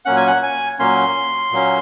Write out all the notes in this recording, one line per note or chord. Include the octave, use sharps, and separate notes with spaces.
A#2 F#3 A#3 C#4 F#5
G#5
F#5
G#5
A#2 F#3 A#3 C#4 C6
A#2 F#3 A#3 C#4